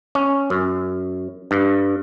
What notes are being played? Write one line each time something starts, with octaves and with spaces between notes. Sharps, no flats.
C#4
F#2
G2